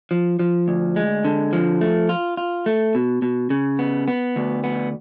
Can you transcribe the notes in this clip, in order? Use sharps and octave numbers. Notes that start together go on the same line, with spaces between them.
F3
F3
D2
G#3
D3
F3
A3
F4
F4
A3
B2
B2
C#3
B3
B3
D2
B3